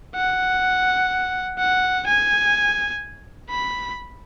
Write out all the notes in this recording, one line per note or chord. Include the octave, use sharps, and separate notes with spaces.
F#5
F#5
G#5
B5